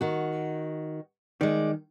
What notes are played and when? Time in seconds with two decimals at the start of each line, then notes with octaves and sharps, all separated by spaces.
0.01 D#3 F#4
1.41 D#3 G#3 D5